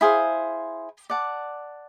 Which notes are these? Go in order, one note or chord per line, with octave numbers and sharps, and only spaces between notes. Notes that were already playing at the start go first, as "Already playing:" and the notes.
E4 G#4 C5 F5
D5 F#5 A5